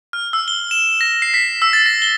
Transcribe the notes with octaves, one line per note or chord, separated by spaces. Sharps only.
F6
E6
G7
E7
A#6
C7
B6
E6
A6
A#6
G7